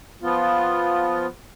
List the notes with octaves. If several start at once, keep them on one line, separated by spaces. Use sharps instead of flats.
F3 B3 F4